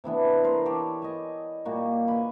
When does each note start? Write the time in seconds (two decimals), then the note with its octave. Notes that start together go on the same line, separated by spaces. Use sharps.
0.04 C3 E3 B3 D4
0.44 G4 A#4 C5 D5
0.65 G4 A4 C#5 D5
1.02 D#5 G#5
1.65 A#2 G3 A#3 F#4
2.08 G#5 B5